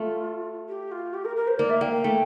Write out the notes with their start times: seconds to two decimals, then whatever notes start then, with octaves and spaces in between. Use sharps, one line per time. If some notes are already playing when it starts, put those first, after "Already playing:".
Already playing: A3 F4
0.69 G4
0.91 F4
1.13 G4
1.25 A#4
1.36 A#4
1.47 C5
1.59 A#3 D5
1.70 E5
1.81 A#3 G5
1.93 G5
2.04 A3